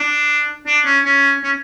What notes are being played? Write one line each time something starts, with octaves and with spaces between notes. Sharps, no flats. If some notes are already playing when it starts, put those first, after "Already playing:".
Already playing: D4
D4
C#4
C#4
C#4